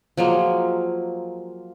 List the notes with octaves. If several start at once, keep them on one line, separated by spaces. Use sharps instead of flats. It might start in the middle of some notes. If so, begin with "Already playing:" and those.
F3 F#3 G#3 A#3